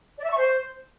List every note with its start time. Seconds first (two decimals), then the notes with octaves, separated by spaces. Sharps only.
0.18 D5
0.24 E5
0.30 C#6
0.37 C5